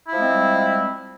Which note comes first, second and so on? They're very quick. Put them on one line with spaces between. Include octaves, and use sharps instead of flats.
E4 F3 G#3 C4 G3